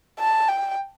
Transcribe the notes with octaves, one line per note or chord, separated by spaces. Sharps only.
A5
G5